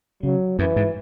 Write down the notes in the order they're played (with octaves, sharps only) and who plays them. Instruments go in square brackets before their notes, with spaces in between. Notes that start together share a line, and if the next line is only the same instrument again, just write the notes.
[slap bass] C#3 [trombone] F#3
[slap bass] F#2 [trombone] E3
[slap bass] G#2